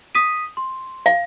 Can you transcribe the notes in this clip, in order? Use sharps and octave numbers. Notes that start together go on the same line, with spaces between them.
D#6 B6 D#7
C6
F5